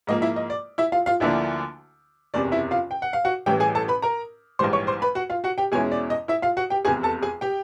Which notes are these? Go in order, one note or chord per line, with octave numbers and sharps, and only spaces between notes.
G#2 F3 A#3 D#5
E4 E5
D#5
D5
E4 E5
F4 F5
F4 F5
D2 D3 F3 A#3 D4 E4 E5
F#1 E2 C3 D5
E4 E5
F4 F5
G5
F#5
F5
F#4 F#5
A1 A2 E3 G3 G4 G5
G#4 G#5
A4 A5
B4 B5
A#4 A#5
A#1 G#2 E3 G3 C5 C6
C#5 C#6
C5 C6
B4 B5
F#4 F#5
F4 F5
F#4 F#5
G4 G5
E2 B2 G#3 C#4 E4 G#4 G#5
D5
D#5
E4 E5
F4 F5
F#4 F#5
G4 G5
F1 E2 C3 G#4 G#5
A4 A5
G#4 G#5
G4 G5